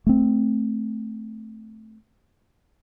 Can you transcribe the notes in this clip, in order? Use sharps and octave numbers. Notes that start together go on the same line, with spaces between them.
A3 C4